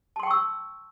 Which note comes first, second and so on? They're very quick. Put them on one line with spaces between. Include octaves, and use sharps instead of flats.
A5 C6 G5 C#6 E6